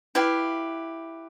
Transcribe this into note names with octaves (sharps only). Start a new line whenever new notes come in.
E4 G4 B4 F5